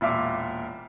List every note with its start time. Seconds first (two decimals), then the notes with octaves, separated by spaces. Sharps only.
0.01 E1 A#2 E5 F5 D6